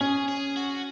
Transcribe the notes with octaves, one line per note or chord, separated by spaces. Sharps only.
C#4 G#4
G#4
F#4